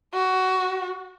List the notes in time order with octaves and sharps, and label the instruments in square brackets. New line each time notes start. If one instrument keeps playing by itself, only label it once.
[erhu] F#4